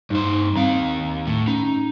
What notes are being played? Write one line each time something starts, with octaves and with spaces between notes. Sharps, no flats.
G2 D#4 C5
D#2 C4 F5
A2
C#4 D#4